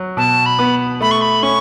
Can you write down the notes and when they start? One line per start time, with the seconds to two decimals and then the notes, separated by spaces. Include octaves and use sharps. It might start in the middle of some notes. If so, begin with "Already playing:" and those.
Already playing: F#3
0.17 B2 A5
0.46 B5
0.59 B3
1.01 A3 B5
1.11 C#6
1.21 B5
1.42 C#4 C#6